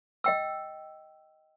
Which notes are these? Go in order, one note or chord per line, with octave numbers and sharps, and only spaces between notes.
D#5 G5 E6